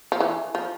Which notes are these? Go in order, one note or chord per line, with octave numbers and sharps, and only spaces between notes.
F3
E3
F3